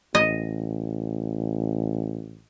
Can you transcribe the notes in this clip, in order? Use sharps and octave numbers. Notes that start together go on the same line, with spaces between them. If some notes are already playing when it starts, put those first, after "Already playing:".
A1 D#5